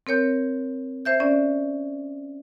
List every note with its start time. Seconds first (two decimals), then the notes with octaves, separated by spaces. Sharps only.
0.07 C4 A#4 C#5 G6
1.05 C5 E5 G6
1.20 C#4 D5